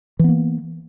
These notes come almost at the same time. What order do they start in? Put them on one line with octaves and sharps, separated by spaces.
E3 B3 A#3